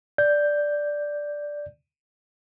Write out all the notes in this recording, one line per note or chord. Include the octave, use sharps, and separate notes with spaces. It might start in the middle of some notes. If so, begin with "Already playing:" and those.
D5 G6